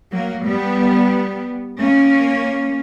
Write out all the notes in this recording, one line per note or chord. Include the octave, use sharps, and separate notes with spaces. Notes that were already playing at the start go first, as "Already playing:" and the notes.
F#3 A#3
G3 B3
A#3 C#4